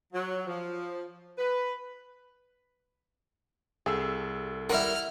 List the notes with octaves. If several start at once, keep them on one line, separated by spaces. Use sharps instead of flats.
F#3
F3
B4
C2 G#4 A4 E6
G3 E4 A#4 F#5 F6